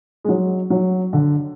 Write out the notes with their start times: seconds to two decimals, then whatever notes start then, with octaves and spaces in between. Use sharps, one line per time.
0.24 G#3
0.28 F#3
0.70 F#3
1.13 D3